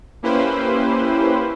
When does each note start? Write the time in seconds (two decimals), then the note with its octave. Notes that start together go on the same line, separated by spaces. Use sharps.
0.23 A#3 C#4 E4 G4 B4 C5